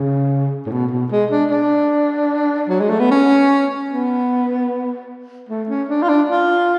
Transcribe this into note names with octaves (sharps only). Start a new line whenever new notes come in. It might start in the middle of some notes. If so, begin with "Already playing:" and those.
Already playing: C#3
A2
B2
B2
G#3
D4
D4
F#3
G#3
A3
B3
C#4
B3
A3
C#4
D4
F4
D4
F4